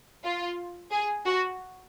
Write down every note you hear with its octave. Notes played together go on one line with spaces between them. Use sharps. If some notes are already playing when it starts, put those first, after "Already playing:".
F4
G#4
F#4